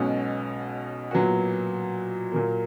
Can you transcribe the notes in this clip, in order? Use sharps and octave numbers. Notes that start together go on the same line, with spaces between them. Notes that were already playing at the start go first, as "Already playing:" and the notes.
Already playing: B1 B2 G#3 C#4 F#4
A#2 F#3 B3 F#4
A#2 F#3 A#3